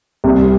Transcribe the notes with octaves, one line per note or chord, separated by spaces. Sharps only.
C2